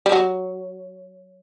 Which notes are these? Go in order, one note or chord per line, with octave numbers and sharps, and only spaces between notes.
G3
F#3